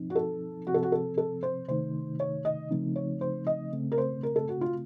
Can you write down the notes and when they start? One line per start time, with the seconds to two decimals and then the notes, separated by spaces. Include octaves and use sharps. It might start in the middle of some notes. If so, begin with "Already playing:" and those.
Already playing: F3 C4 D#4
0.10 F#4
0.16 A4
0.67 C3 F3 C4 F#4
0.74 A4
0.83 F#4
0.92 A4
1.18 A4
1.43 C5
1.68 C3 D#3 A3 D#4 C5
2.20 C#5
2.45 D#5
2.71 C#3 F3 A3 C4 D#4
2.96 C#5
3.21 C5
3.47 D#5
3.72 C#3 A3 C4
3.92 A#4
3.98 C5
4.23 A#4
4.36 A4
4.49 F#4
4.61 F4